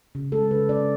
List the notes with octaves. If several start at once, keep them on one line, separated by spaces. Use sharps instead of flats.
C#3
G#3 A4
C#3 B4
C#4 D5